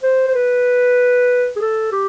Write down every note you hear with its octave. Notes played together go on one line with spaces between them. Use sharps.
C5
C5
B4
G#4
A4
G4